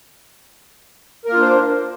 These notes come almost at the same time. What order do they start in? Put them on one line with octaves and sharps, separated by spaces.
A#4 A#3 F4 D4 C5